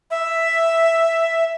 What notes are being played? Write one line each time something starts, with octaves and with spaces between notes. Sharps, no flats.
E5